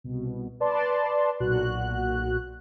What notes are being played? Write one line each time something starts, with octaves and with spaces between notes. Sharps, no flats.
C2 B2
B4 D5 A5 C6
B1 A#2 F#4 F#6